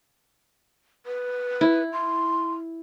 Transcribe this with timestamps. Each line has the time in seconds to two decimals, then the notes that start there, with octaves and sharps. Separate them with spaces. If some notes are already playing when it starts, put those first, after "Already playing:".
1.06 B4
1.61 E4
1.93 C6